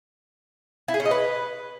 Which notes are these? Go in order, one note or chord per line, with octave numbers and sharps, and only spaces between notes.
E4
G#4
C#4
D#5
B4